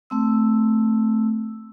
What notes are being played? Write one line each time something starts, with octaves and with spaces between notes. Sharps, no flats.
A3 C4 E6